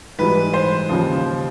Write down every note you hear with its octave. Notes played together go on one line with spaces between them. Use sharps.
G#2 E3 G3 B4
C5
D#2 C#3 F3